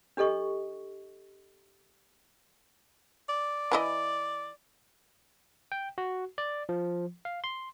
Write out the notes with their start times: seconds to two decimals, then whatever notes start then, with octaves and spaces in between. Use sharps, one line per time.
0.17 D4 G4 A4 D#5 C#6
3.29 D5
3.71 E3 E4 D#5
5.72 G5
5.98 F#4
6.38 D5
6.69 F3
7.25 F5
7.44 C6